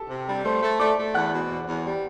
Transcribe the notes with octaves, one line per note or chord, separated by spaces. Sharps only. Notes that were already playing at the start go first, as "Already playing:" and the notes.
Already playing: G4 A4 A5
C3
G3
A3 C5 C6
A3
A3 D5 D6
A3
E2 F#5 F#6
B2
E2
E2
G3